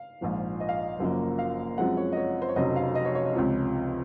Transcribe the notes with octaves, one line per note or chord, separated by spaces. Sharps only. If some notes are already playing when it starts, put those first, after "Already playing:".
Already playing: F5
A#1 G#2 F3
D#5
F5
D#5
F#1 F#2 F3 A#3
F5
F#2 F3 G#3 C4 F#5
C#5
D#5
C#5
C5
C#5
F1 F2 C#3 F#3 C4 D#5
F5
D#5
C#5
C#5
D#5
C#2 C3 F3 C#5